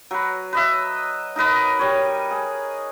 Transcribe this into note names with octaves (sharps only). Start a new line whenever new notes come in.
F#3 B4
B4 D#5 E5
D#4 A#4 B4 D#5
G3 C#5
G#4